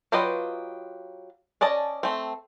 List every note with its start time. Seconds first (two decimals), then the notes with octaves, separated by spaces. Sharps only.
0.12 F#3 F4 G4 B4 D#5
1.61 C#4 D5 D#5 A5
2.03 A3 C4